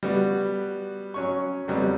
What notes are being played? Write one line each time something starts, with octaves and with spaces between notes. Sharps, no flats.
G3 B3 F#4
F#3 C#4 C#6
F2 F#3 G3 B3